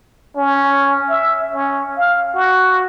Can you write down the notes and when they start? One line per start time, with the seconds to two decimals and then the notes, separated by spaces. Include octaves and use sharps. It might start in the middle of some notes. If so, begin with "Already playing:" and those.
0.36 C#4
1.10 E5
1.53 C#4
1.97 F5
2.35 F#4